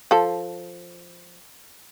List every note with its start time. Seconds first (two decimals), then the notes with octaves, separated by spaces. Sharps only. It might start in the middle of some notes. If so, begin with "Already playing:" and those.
0.11 F3 A4